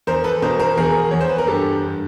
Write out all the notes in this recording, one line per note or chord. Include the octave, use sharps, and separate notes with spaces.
E2 A#4 C5
A4 B4
B2 A#4 C5
A#4 C5
E2 G#4 A#4
E2 C#5
C5
B4
A#4
G2 G4 A4
G2